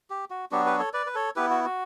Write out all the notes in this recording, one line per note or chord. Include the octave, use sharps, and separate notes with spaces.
G4
F#4
F#3 B3 D4 F#4 G4
G4 B4
A4 C#5
B4 D5
B4
A4 C#5
B3 E4 G4 B4
F#4
F#4